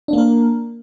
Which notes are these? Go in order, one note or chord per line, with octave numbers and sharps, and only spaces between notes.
A#3 D4 A#4